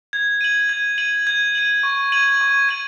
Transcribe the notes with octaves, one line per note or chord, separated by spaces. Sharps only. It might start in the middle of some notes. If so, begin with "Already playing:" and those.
G#6
D#7 F#7
G#6
D#7 F#7
G#6
D#7 F#7
C#6
G#6 D#7 F#7
C#6
G#6 D#7 F#7